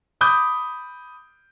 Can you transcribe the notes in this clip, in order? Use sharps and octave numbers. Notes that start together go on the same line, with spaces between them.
B5 D6 D#6 G6